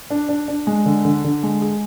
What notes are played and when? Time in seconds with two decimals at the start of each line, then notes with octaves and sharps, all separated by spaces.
0.10 D4
0.29 D4
0.48 D4
0.67 G#3
0.86 D3
1.05 D3
1.24 D3
1.43 G#3
1.62 G#4